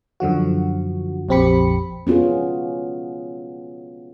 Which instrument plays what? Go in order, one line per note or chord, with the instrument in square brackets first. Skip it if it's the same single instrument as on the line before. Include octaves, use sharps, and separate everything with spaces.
[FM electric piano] F#2 D3 F3 F#4
A#1 F2 C4 G4 B5 C#7
[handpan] B3 C#4 F4 F#4 G#4